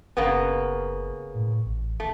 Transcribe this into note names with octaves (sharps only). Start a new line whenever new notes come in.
F#1 C#3 A#3 B3
A2
A1
D#1 A3